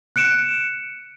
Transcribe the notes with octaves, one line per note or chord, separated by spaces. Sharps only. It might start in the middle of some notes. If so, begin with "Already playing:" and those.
F#6 C#7 D7 E7